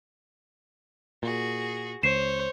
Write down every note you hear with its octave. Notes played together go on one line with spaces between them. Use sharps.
A#2 F#4 G#4
C#2 C5 C#5 C7 E7